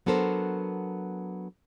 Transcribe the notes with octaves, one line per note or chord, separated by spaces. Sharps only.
F#3 B3 D4 A4 A#4 C5